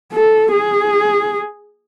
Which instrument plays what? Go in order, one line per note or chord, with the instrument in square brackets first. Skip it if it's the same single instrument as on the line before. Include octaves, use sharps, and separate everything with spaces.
[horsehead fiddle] A4
G#4